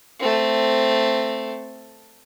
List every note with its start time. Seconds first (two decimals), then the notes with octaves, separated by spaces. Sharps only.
0.20 A3 C4